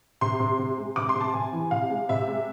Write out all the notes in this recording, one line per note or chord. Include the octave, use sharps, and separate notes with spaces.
C3 C6
C3
C3
G#3
C3 D6
C6
C3
A5
C3 G#5
E3
C3 F5
G#3
C3 E5
G#3